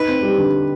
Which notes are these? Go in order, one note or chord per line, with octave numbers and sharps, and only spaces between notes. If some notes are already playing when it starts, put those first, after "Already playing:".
Already playing: D#4 B4
C4
G3
D3